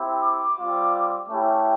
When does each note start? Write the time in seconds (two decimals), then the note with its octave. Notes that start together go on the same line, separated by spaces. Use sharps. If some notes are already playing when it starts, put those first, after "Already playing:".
Already playing: C4 E4 G4
0.21 D6
0.57 G3 C4 F4
1.29 A3 C#4 E4 G4